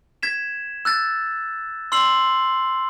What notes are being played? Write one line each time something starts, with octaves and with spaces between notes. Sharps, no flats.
G#6 B6 E7
E6 F#6 A6
C6 E6 C7 F#7